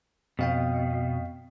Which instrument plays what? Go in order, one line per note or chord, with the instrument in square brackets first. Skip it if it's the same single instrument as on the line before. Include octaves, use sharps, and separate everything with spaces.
[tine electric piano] F2 F5 G5 [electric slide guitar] B2